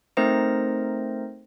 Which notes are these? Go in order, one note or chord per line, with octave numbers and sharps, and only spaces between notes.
A3 C4 D#4 A#4 C5 A#6